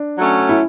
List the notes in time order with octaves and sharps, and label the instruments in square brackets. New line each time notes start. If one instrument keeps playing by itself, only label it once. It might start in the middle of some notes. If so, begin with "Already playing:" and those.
Already playing: [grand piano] D4
[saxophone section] F#3 A3 C#4
[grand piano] E4